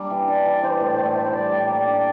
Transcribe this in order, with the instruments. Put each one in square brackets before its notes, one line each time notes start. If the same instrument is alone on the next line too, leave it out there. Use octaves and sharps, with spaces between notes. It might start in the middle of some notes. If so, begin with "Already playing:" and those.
Already playing: [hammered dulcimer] G3 A#3 D4
E3
[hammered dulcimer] D4 [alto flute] D5
[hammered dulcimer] E3
[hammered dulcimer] E3 [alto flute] C5
[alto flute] D5
[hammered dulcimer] A2 [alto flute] C5
[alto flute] D5
C5
[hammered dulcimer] A3 [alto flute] D5
[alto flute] C5
[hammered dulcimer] E4 [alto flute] D5
[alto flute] C5
[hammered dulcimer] G3 [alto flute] D5
[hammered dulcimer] A2
[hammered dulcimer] A#3 [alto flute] D5
[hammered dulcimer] D4